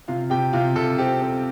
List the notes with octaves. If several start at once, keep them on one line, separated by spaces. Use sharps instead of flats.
C3 F4 F5
C3 G4 G5
C3 F4 F5
C3 A4
C4 G4
C4 A4